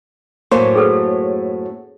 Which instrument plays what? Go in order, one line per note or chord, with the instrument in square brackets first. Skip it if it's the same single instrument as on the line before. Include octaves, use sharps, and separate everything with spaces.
[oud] F#2 A2 F#3 [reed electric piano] A#3 C5 C#5
[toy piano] G#4 A4 B4